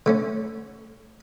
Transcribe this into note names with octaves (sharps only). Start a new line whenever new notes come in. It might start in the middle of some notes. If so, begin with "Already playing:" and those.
D3 A3 C#4